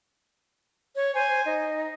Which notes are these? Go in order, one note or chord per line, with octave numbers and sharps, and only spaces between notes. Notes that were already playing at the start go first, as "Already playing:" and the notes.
C#5
C5 G#5
D#4